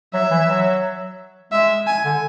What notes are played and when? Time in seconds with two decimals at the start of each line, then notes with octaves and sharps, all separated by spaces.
0.14 F#3 E5
0.31 E3
0.49 F#3
1.52 G#3 E5
1.87 G#5
2.05 D3